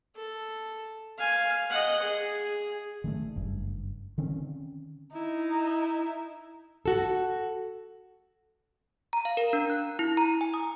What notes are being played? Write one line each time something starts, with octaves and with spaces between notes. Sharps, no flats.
A4
F5 G#5
D#5 F#5
G#4
D#3 G#3 A3
F#1 G2
D3 D#3 C4 C#4
D#4 E4
F#4 A4
A#5
F5
A#4
D4
F#6
E4
A#5
G#5
D#6